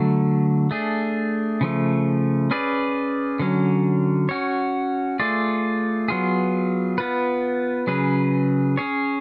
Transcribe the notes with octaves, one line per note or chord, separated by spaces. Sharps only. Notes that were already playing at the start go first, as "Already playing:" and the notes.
Already playing: D3 F#3 A3
A3 D4 G#4
C#3 F3 A3
C#4 G#4 B4 D5
D3 F#3 C#4
C#4 F#4 C#5
A3 F4 G#4 D5
F#3 B3 F4 G#4
B3 F4 B4
C#3 F#3 C#4 G#4 B4
C#4 G#4 C#5